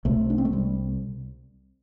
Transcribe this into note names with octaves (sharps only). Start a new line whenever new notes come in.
C2 C3 A3
D4
C4
A3
G3